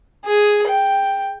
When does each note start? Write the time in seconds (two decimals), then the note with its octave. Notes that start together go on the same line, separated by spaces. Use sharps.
0.25 G#4
0.68 G5